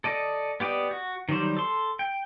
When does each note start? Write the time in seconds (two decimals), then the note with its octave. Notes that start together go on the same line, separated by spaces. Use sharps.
0.04 A4 D5 D#5
0.60 B3 G4 D5 D#5
0.91 F#4
1.29 D#3 F#3 G3 C5
1.57 A4 C6
1.99 G5